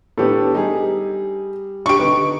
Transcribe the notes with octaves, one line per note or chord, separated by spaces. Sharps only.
A2 B3 D4 G4 A4
G3 D#4 G#4
D4 G4 C#6 D7
D3 D#4 B4